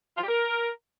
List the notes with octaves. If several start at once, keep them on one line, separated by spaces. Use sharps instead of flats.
F4
G4
A#4